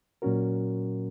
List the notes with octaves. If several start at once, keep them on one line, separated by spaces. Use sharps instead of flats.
A#2 F#3 C#4 F#4 A#4